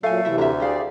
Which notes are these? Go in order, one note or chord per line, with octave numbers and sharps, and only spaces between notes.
A#2 F#3 A3 F5 G#5
C3 E3 E4 E5
D2 E5 A#5
G4 G#4 D5 F5